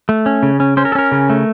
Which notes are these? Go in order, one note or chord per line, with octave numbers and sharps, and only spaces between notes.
A3
C#4
C#3
C#4
C#4 C5
A#4
A4
C#4 A#4
C#3
A3